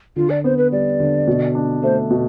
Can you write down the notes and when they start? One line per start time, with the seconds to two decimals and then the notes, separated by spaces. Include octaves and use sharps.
0.16 D3 F4
0.30 D5
0.44 B3 C5
0.58 B4
0.72 G3 D5
1.00 D3
1.27 B2
1.55 D4
1.83 A3 C5
2.11 B2